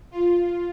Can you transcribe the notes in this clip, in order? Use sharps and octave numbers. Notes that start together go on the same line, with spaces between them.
F4